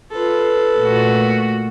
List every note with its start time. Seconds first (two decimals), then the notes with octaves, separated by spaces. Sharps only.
0.12 F4 A4 B4
0.79 A#2 A3 F#4